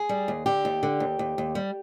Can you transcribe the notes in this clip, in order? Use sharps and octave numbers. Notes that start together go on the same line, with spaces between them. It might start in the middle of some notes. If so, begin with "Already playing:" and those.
Already playing: G#4
G3
D#2
D3 G4
D#2
D3
D#2
D#2
D#2
G3